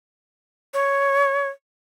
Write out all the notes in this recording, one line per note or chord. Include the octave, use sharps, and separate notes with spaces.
C#5